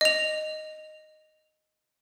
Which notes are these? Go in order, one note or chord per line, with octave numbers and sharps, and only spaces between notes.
D#5 F7